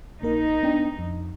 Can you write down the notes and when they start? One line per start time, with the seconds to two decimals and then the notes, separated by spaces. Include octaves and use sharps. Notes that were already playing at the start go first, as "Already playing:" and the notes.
0.22 A#1 A#3 D#4 A#4
0.63 B3 D4 G5
0.99 F2